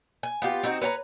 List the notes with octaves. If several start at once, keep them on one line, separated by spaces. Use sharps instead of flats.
G#5
B3 F4 G4
C4 D#4 F#4
B4 C#5 G5 A#5